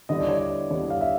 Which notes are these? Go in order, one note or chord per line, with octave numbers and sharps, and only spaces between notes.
D3 G3 B3 E4 D#5
D5
C#5
D5
D3 G3 B3 E4 C#5
F5
E5